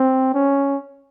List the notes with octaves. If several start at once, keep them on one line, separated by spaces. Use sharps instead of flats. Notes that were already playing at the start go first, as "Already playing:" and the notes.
Already playing: C4
C#4